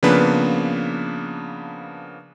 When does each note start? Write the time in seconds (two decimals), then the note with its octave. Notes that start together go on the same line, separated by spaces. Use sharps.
0.03 C#3 F3 A#3 B3 D4 B4